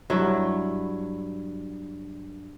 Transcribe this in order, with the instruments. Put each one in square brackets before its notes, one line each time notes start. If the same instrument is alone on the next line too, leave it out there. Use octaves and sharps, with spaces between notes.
[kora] G2 F#3 E4